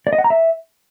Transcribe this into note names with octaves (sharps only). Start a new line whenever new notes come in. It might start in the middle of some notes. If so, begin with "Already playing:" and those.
D5
D#5
F#5
A#5
E5